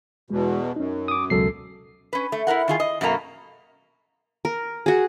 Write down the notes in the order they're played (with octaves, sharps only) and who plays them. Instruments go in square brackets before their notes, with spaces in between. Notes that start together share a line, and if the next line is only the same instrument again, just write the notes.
[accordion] E2 B2 [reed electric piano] G#3
[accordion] F#2 [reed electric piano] C#4 D#4
[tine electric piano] D6 D#6
[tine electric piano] C#2 A4 C7 [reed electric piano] B2 F#3
[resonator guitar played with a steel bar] C#4 B4
A3
E4 F4 A#4 F#5
D#3 F4 G#4
D#5
F#2 B2 A3 A#3 A#5
[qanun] A#4
F#4 G#4